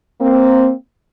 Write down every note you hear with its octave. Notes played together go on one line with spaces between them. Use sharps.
A#3 C4